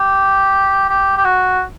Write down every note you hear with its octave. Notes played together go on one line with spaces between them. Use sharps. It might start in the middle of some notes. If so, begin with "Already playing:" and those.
Already playing: G4
G4
G4
F#4